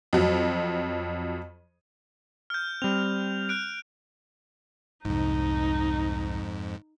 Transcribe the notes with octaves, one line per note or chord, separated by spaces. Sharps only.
F2 F#3
F6 G6
G3 C4 F7
F#6 D7
C2 F2 G#2 D#4